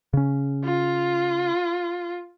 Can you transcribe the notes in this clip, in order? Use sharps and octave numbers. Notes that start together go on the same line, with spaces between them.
C#3 C#4
F4